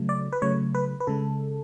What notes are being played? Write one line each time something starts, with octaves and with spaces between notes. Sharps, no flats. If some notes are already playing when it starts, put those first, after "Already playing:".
Already playing: C#3 F#3 A3
D5
B4
C#3 F#3 A3 C#5
B4
B4
C#3 G#3 A4